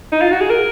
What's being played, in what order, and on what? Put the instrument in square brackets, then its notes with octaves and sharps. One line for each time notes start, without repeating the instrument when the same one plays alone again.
[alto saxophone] D#4
F4
F#4
G#4
A#4